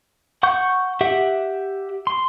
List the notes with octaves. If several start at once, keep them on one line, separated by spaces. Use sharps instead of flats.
F#5 C#6 G6
G4 E5 F#5
C6